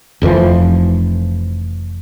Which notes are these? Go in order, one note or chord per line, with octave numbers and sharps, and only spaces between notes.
F1 F2 E3 F3